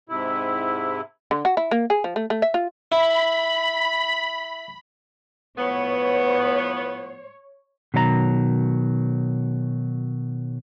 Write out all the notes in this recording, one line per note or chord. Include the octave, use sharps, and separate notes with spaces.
G#2 C3 E4
D3
F#4
E4
A#3
G#4
F3
A3
A3
E5
F4
E4 B5
A2 F3 B3 C#5
B2 D#3 F#3 D#4 A#5